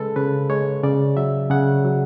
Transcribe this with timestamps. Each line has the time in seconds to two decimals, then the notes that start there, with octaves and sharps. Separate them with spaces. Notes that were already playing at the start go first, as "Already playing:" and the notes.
Already playing: C#3 G#3 A4 B4
0.16 C#3 B4
0.50 G#3 C#5
0.84 C#3 D5
1.16 F#3 E5
1.50 C#3 F#5
1.85 F#3